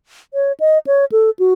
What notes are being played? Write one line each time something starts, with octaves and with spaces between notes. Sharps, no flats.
C#5
D#5
C#5
A4
F#4